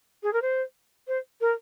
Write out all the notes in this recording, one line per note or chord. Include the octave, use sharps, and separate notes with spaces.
G#4
A#4
C5
C5
A#4